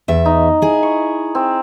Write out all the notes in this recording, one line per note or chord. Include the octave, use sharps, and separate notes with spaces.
E2 E5
D#4
E4 G#4
C#6
C4